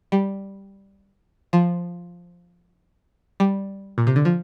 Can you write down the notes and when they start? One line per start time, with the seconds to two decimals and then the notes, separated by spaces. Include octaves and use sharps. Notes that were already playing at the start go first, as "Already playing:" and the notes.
0.12 G3
1.53 F3
3.40 G3
3.98 A#2
4.07 C3
4.16 D3
4.25 F3